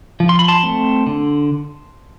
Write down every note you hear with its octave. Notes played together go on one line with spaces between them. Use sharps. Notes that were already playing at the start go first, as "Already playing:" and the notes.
F3
C6
B5
A5 C6
A3 C4
D3